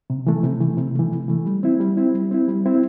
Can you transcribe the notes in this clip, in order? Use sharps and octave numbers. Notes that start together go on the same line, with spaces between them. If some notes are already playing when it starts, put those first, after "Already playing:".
C3
E3 A3
C3
E3 A3
C3
E3 A3
C3
E3 A3
G3
C4 E4
G3
C4 E4
G3
C4 E4
G3
C4 E4